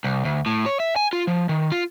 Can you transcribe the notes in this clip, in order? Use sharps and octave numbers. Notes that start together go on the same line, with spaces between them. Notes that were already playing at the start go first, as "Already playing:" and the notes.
C2
D2
A2
C#5
E5
G#5
F4
F3
D#3
F4